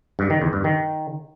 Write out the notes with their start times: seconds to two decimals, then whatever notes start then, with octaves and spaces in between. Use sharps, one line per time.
0.19 G2
0.30 D#3
0.42 E2
0.53 G2
0.64 D#3